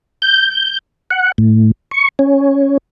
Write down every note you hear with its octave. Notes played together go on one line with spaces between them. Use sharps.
G6
F#5
A2
C#6
C#4